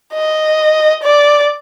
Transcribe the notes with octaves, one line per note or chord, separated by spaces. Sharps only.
D#5
D5